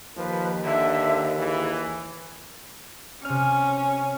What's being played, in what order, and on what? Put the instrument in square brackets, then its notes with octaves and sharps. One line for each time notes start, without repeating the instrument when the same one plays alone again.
[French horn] D#2 [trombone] F3 [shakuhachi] B4
[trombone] D3 [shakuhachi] E5
[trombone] E3 [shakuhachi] G#4
[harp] C3 F6 [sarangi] C#4